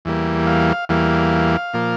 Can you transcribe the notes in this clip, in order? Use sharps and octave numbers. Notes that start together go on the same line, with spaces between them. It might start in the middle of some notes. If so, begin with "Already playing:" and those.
E2 E3 G3 A#3
F5
E2 E3 G3 A#3 F5
A#2 F3 A#3